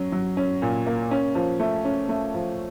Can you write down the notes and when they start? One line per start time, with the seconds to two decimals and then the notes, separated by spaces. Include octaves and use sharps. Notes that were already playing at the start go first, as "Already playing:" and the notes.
Already playing: F#3 C#4
0.12 F#3
0.37 C#4
0.62 A#2
0.87 A#3
1.11 C#4
1.35 F3
1.60 A3
1.85 C#4
2.09 A3
2.34 F3